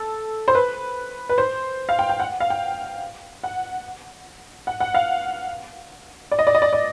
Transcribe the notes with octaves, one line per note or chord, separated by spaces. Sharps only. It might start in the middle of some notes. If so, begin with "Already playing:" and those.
Already playing: A4
C5
B4
B4
C5
F5
G5
G5
F#5
F5
G5
F#5
F#5
F#5
F5
D5
D#5
D5
D#5
D5
D5